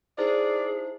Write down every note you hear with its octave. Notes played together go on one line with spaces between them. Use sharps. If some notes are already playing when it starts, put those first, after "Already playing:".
D#4 E4 G#4 C5 D5